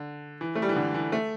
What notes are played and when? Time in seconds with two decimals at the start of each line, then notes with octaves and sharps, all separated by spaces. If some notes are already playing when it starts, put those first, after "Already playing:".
Already playing: D3
0.41 E3
0.55 A3
0.62 G3
0.69 E3
0.76 D3
0.94 E3
1.12 A3